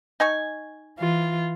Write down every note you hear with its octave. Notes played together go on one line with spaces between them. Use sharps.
D#4 G#5 C#6
E3 F4